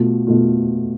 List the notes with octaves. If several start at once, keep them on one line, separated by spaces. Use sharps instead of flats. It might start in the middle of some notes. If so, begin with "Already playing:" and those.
Already playing: B2 A3 F4
B2 A3 F4